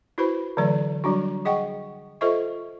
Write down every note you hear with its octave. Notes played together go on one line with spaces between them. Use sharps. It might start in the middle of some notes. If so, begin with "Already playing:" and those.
E4 F#4 B4 C5 B5
D3 E3 F#3 A3 D5
F#3 G3 D4 F#4
G#4 D#5 F#5 G5 C#6
F4 A4 C5 D#5 E5 C#6